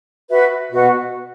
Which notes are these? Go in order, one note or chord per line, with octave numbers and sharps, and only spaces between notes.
F#4 B4 E5
B2 F#4 B4 F#5 C#6